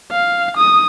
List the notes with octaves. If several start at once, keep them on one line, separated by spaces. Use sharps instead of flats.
F5
D#6